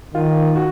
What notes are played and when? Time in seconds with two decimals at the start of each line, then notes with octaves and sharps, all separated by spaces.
0.14 D#3 F4
0.56 F#4